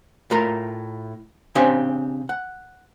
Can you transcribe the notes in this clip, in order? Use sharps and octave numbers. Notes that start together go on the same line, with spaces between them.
A2 F4 A#4 A#5
C#3 C4 D4 G4 G#5 C6
F#5